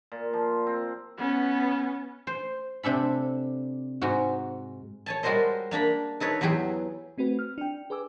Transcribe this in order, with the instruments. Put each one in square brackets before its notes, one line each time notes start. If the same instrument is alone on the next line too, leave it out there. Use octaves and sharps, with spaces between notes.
[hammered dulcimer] A#2
F3
C4
[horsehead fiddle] B3 C#4
[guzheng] C5
C3 D4 A4 B5
G#2 F#4
C#5 G#5 A5
G3 G#3 F#4 A#4 C5 D#5
A#3 D4 A#5 B5
D#4 A4 B4 C#5
E2 F#3 G4 G#4
[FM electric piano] A3 C4 F#4 B4
F6
D4 G5
G#4 B4 G#5 D6 E6